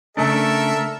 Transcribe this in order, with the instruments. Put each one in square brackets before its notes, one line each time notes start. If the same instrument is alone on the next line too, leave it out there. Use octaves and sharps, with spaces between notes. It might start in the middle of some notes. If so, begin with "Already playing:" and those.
[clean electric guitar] C#3 A3 D4 [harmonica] A4 A#4 E5